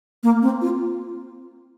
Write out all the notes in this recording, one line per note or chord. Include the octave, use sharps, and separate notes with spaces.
A#3
C4
F4